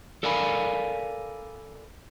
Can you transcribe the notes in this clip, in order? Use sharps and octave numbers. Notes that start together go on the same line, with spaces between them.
A4 A#4 D5 F5 G#5 B5